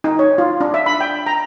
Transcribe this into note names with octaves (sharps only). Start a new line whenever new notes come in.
D#4
C#5
F4
D4
E5
B5
G5
A#5